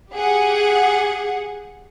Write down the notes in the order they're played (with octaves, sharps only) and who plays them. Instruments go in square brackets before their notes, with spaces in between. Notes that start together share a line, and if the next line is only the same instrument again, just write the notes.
[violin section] G4 G#4 F#5